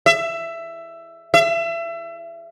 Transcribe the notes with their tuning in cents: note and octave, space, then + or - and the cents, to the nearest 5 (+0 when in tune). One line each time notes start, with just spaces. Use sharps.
E5 +15
E5 +30